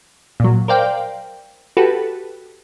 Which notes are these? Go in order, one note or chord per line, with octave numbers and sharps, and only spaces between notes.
A#2 F#3
A#4 C5 D5 F5 G5
F#4 G4 A4 B4